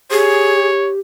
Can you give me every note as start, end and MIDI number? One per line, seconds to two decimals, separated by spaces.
0.11 0.99 67
0.11 0.66 68
0.11 0.90 73